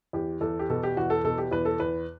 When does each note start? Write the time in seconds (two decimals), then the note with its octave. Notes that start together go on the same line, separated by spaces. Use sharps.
0.13 E2 G4
0.41 E2 A4
0.59 G4
0.69 B2 A4
0.83 G4
0.97 E2 F#4
1.10 A4
1.24 B2 A4
1.38 G4
1.51 E2 B4
1.65 A4
1.80 E2 B4